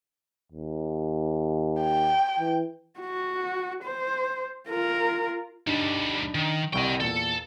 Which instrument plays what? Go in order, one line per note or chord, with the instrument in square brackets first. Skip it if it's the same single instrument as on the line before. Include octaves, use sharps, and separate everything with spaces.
[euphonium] D#2
[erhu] G5
[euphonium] E3
[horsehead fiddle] F#4
C5
F4 A#4
[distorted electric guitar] D2 G3 [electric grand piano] D4 D#4
[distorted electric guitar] D#3
[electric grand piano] C2 G3 C#6 [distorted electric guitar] D#5 G5
[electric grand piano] E2 A#2 [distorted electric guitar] A4